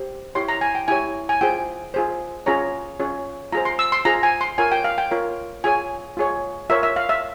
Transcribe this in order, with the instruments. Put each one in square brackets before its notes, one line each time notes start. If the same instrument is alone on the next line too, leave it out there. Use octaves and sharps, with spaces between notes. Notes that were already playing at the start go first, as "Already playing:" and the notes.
Already playing: [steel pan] G4 C5
E4 G4 C#5 C6
A#5
G#5
G5
E4 G4 C#5 G#5
G#5
F4 G#4 C5 G5
F4 G#4 C5
C#4 F4 G#4 C#5 A#5
C#4 F4 G#4 C#5
F4 G#4 C5 A#5
C6
E6
C6
F4 G#4 C5 A#5
G#5
C6
F4 A#4 C#5 G#5
G5
F5
G5
F4 A#4 C#5
F4 G#4 C#5 G#5
F4 G#4 C#5
F4 A#4 C#5 E5
E5
F5
E5